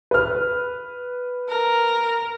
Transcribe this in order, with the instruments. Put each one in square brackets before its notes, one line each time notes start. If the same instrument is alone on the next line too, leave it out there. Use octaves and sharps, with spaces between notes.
[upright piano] B4 F6
[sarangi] A#4